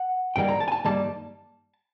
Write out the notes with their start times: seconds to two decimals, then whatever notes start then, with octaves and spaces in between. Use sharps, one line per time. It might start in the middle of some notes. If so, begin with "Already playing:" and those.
Already playing: F#5
0.36 G2 D#3 G3 A#3 G5
0.49 A#5
0.60 A5
0.68 G#5
0.72 A5
0.84 G2 D#3 G3 A#3 A5